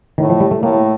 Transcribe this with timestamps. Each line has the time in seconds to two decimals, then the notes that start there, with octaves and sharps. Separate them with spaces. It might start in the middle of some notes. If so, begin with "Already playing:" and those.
0.18 A2 D#3
0.29 F3
0.40 G3
0.51 A3
0.63 A2 A#3